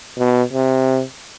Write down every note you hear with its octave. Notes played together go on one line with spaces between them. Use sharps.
B2
C3